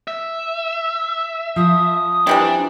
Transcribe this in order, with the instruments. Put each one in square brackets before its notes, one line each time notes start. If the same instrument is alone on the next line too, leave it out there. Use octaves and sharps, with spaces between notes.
[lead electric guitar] E5
[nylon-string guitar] F3 [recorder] D#6
[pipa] C3 E3 G3 [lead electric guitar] D4